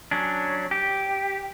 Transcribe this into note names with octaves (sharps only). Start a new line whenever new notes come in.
F#3 C#4 D4
G4